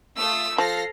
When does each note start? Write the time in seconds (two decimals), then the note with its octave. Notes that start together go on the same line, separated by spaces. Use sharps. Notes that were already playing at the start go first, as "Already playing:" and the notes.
0.17 A3 F4 D#6 E6
0.58 F3 A4 F6 A#6 C7